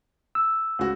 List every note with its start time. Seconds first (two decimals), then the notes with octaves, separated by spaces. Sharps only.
0.35 E6
0.79 C#2 F#4